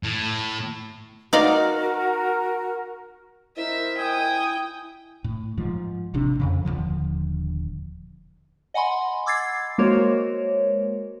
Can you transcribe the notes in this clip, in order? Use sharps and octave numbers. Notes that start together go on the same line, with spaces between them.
A2
D#4 F#4 A#4 D5 F5 F#5
E4 A#4 C5 D#5 E5
G5 G#5 D#6
A2
G#2 F3
A1 C3 D4
F2 A2 C#3
D#1 D#2 D3 F3
D#5 F#5 G#5 B5 C6
D6 E6 G#6 A6 C7
G#3 A#3 F#4 A#4 C5 C#5